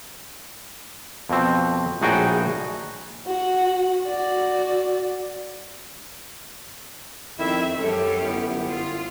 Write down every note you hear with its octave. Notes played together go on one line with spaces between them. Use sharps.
F2 B2 C4
A#1 A2 D#4 F#4 G#4 G5
F#4 F#5
F#4 D5
F2 D#3 C4 E4 E5
F#2 G#3 C#4 G4 A4
G1 B3 E4
F4